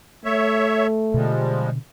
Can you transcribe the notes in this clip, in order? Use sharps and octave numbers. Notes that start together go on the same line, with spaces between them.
A3 C#5 E5
B2 D3 F3 G3 G#3